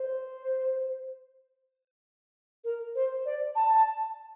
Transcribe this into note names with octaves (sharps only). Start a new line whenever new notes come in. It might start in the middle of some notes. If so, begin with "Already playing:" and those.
Already playing: C5
A#4
C5
D5
A5